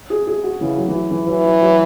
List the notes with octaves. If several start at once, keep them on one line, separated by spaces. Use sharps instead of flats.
G#4
G#4
F#4
C#3 E3
F#3
E3
F#3
E3
E3 F#3
F#3
F#3